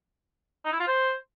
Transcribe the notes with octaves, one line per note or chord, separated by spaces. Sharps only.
D#4
E4
F4
C5